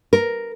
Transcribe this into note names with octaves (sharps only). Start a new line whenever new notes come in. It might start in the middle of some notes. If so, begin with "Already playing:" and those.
A#4